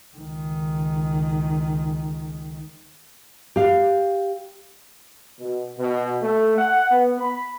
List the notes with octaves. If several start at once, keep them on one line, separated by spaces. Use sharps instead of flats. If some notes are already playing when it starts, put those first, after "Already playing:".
C#2 D#3
G4 F5
B2
B2
A3
F#5
B3
B5